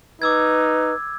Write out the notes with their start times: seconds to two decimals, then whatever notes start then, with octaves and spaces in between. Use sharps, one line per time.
0.22 D#4 B4 D6 E6 G#6